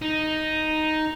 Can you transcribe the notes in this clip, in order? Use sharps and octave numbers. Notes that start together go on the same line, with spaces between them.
D#4